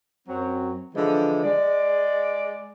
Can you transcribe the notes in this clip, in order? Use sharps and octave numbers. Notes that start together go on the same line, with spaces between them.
F#2 F#3 C4
D3 E3 F3 G#3
G#3 D5